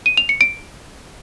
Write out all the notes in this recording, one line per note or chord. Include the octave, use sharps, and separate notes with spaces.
D#7
F7
C#7
D7